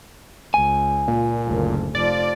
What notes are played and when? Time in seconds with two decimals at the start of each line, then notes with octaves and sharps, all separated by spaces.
0.54 C#2 G#5
1.08 A#2
1.46 F#1 D2
1.95 F1 F3 D5